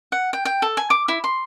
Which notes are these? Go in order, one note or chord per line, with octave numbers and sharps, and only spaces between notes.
F#5
G5
G5
A4
G#5
D6
E4
C6